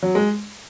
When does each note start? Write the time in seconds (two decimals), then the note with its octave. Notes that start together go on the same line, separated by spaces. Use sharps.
0.03 F#3
0.15 G#3